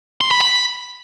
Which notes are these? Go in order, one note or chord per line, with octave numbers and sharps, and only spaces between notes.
C6
B5
B5